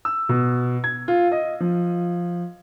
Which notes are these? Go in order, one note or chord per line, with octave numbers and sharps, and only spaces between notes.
E6
B2
G#6
F4
D#5
F3